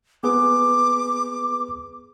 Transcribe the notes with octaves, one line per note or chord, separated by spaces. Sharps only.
B3 G#4 B4 D6